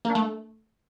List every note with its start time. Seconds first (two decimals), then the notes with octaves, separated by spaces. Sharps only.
0.05 A#3
0.10 D4
0.15 A3